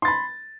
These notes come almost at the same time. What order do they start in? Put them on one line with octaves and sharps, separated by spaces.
C6 A6 B5